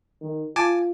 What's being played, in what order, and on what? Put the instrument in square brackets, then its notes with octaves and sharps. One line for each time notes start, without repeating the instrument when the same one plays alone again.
[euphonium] D#3
[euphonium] F4 [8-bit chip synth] G#5 A5 D6